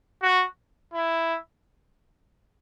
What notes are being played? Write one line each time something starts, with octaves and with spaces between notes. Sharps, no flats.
F#4
E4